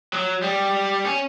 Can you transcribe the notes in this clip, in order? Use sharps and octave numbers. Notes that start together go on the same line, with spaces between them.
F#3
G3
C#4